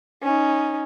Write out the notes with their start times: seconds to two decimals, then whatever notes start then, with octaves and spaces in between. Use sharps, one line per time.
0.23 C#4 D#4